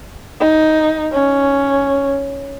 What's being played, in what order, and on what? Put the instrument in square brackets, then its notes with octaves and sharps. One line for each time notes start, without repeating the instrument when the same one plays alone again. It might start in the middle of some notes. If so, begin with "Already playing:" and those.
[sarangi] D#4
C#4